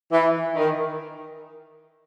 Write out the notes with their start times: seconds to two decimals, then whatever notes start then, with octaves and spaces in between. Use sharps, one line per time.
0.12 E3
0.56 D#3